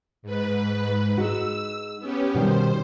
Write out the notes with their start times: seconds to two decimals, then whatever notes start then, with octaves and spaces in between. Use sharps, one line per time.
0.22 G#2 B4
1.18 G#3 D#4 F#4 E6
1.99 B3 C#4 G4
2.35 B2 D#3 G3 C5